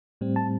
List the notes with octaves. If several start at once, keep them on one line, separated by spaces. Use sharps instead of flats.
A2 G3 C4
A5